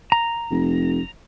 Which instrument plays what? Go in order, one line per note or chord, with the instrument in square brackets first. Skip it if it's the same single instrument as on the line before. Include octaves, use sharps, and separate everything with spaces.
[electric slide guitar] A#5
[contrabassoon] F1